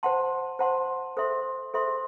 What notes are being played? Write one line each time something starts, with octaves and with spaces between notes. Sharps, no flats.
C5 F#5 A5 C6
C5 F#5 A5 C6
A4 C5 E5 C6
A4 C5 E5 C6